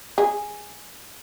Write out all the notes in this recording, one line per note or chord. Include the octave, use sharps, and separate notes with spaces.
G#4